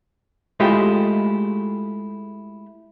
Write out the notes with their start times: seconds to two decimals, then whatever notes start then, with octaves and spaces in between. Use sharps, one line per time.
0.60 G#3 A3 E4 F4 G4 G#4